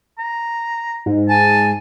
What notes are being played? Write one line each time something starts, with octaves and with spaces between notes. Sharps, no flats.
A#5
G#2
G#5 A5